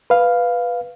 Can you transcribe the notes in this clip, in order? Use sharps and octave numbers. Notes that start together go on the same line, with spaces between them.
B4 F5